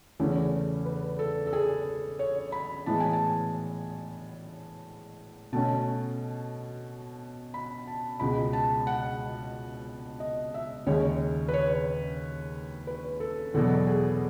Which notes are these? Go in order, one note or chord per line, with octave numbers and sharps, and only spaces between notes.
E2 C#3 E3 A3 C#4 G#4
B4
A4
A4
G#4
C#5
B5
A2 E3 G#3 B3 A5
G#5
A5
B2 A3 C#4 A5
B5
A5
C#2 B2 G#3 B5
A5
F#5
D#5
E5
D#2 C#3 G#3 C#4 C#5
B4
C#5
B4
A4
E2 B2 F#3 B3 A4
G#4